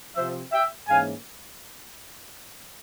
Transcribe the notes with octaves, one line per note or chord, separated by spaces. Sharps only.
C3 F3 C4 C5 E5
E5 G5
G#2 E3 A#3 C#4 F5 G#5